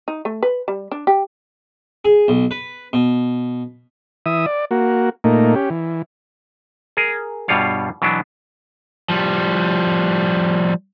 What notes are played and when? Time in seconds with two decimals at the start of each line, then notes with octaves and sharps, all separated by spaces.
0.08 D#4
0.25 A3
0.43 B4
0.68 G3
0.91 D4
1.07 G4
2.05 G#4
2.28 B1
2.51 B4
2.93 B2
4.26 E3 E5 D#6
4.46 D5
4.71 A#3 F#4
5.24 A#2 A3 A#3 D#4
5.55 C#4 G4
5.70 E3
6.97 G#4 A#4
7.48 G2 B2 G3 F4 C#5 F5
8.02 B2 E3 F#3 B3 D4
9.10 F3 G3